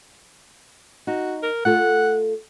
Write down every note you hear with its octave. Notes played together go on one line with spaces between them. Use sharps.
D#4 F#4
A#4
A3 F4 A4 F#5